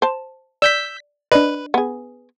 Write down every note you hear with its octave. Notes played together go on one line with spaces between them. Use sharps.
C5 A5
D5 E6 G6 B6
D4 B4 D5 D#5
B3 G#4